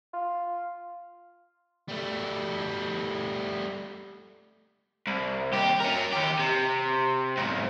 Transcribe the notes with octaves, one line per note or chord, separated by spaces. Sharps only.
F4
G3 A3
C2
D#2 G4
C#4 A#4
D#2 G4
C3
B1 G#2